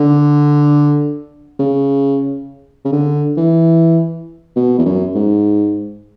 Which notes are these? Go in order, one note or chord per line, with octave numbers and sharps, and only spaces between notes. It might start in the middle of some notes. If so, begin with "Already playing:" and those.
Already playing: D3
C#3
C#3
D3
E3
B2
E2
F#2
G#2